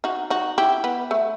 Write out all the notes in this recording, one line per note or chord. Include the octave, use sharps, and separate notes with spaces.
D#4 F#4
D#4 F#4
E4 G4
B3
A3